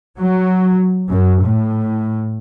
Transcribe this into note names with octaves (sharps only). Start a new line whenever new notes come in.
F#3
F#2
A2